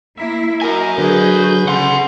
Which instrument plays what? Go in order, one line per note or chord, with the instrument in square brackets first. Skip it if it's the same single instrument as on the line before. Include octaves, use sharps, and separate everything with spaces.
[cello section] A#3 E4 [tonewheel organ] E5
[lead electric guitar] F#4 G#5 [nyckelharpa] A#4 [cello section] D#5
[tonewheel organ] D3 F#3 G6 [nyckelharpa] G#4 B4
[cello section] C#3 [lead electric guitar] F#5 C6